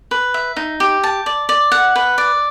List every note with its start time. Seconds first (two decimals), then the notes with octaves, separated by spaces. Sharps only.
0.11 B4
0.34 E5
0.57 D#4
0.80 G4
1.04 A5
1.26 D5
1.49 D5
1.72 F#5
1.96 B4
2.18 D5